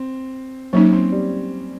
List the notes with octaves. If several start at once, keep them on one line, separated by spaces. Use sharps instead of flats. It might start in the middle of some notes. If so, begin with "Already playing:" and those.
Already playing: C4
F#3 A#3 C#4 D#4
C4
G3